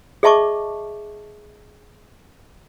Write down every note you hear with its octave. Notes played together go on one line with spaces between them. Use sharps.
G#4 D#5 E5 A5 C#6 D6